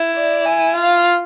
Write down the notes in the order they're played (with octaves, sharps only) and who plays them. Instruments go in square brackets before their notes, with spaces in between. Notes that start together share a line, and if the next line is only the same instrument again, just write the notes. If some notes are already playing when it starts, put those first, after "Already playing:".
Already playing: [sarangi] E4
[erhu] D5
G#5
[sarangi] F4 [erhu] F5